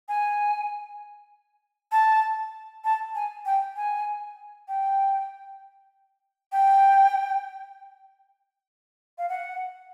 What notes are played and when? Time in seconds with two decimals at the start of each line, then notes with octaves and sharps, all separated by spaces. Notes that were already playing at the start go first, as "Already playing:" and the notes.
0.09 G#5
1.92 A5
2.85 A5
3.15 G#5
3.46 G5
3.76 G#5
4.68 G5
6.52 G5
9.18 F5
9.29 F#5